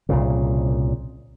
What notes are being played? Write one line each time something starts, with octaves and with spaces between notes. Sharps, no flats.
C2 A#2 C#3